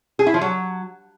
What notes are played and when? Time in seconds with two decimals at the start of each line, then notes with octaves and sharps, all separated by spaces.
0.19 G#4
0.27 E4
0.34 F3
0.41 F#3